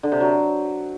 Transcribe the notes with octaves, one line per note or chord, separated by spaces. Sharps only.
D3
C3
F#3